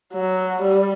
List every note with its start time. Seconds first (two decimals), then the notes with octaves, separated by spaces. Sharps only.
0.13 F#3
0.62 G3